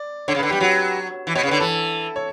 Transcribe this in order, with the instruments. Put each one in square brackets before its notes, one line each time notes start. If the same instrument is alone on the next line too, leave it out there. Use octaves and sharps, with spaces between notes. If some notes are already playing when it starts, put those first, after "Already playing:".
Already playing: [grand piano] D5
[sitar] D3 [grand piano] C#5
[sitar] C#3
[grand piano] B4
[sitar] D3
[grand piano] G4
[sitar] G3
[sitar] F#3 [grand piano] F#4
[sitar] E3
[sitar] B2 [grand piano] C#5
[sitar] C#3
[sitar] D3 [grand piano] B4
[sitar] E3 [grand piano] A4
[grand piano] C#5